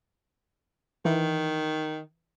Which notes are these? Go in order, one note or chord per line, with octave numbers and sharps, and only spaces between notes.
D#3 E3